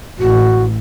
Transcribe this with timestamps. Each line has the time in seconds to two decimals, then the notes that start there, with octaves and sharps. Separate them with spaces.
0.19 A1 F#4